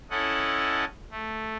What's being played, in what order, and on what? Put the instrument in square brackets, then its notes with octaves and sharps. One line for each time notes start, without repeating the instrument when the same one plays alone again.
[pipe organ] C#4 E4 A4 D#5 F#5
A3